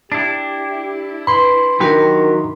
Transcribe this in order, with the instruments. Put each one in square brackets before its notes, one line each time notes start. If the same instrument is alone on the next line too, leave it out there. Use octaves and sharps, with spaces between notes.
[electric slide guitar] D4 E4 [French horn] G4
[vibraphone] B4 [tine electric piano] B5 C6
[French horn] D#3 [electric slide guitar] F#3 E4 G4 [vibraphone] D4 F#4 A#4